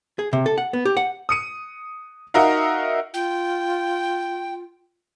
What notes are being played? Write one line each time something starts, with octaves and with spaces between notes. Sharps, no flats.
G#4
C3
A4
F#5
B3
G4
F#5
D#6 C#7 D#7
D#4 F#4 A#4 E5 F5
F4 G5